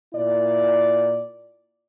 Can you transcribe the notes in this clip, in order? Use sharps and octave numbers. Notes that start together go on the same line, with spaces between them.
A#2 E4 D5